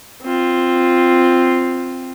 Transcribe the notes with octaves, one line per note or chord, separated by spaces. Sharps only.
C4 F4